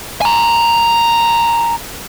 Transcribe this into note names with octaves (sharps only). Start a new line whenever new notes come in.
G#5 A#5